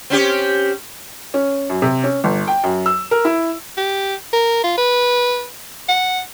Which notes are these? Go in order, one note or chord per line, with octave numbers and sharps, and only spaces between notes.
C4 C#4 G4
C#4
F#2
C3
C#4
G1
G5
F#2
E6
A#4
E4
G4
A#4
F4
B4
F#5